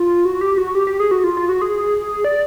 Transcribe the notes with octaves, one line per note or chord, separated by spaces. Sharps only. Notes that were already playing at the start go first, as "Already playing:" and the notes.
Already playing: F4
F#4
G4
F#4
G4
G4
G#4
F#4
F4
F4
F#4
G#4
D5